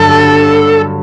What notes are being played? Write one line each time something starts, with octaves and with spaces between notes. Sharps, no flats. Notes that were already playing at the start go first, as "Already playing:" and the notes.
Already playing: G2 D3 F#3 A4